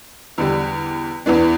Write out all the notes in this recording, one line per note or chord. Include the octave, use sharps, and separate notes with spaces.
E2 D3 G3
E2 E3 B3 D4